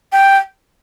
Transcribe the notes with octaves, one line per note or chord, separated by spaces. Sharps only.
G5